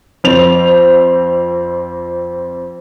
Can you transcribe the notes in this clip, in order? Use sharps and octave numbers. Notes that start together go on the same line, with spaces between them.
F2 C4 F7